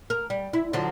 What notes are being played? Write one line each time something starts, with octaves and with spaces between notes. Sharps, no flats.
A#4
G3
E4
D3 F3 F#3